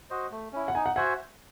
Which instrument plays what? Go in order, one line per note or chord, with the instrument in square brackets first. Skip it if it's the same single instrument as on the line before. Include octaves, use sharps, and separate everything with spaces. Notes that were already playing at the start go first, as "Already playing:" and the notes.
[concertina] F#4 C5 D#5
A3
C#4 E4
[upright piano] F#5
[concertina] D#4 [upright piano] G#5
[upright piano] F#5
[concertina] F#4 C5 E5 G#5 [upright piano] F#5